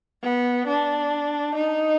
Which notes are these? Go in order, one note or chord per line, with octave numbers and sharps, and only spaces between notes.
B3
D4
D#4